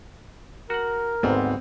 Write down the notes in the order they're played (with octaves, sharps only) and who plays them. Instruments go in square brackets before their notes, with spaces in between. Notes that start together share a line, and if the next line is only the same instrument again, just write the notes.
[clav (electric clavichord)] F#4 F#5 [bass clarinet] A#4
[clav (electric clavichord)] G#1 D2 G#2 [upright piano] B3 C4